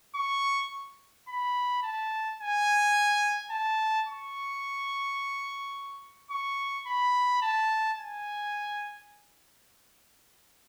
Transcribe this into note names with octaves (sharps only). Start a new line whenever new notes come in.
C#6
B5
A5
G#5
A5
C#6
C#6
B5
A5
G#5